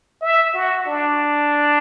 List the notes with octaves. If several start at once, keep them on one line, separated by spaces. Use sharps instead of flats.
E5
F#4
D4